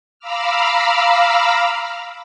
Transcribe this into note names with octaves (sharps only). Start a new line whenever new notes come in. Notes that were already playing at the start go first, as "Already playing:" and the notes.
F5 A#5 B5 D6 E6 F6